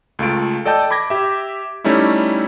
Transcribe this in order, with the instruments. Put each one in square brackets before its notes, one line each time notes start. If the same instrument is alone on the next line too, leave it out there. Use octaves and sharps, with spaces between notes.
[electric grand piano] C#2 A3 F4 D7
A4 D5 D#5 G5 A5 G6
B5 D6 G#6 A#6
G4 E5
G3 A3 C#4 D#4 E4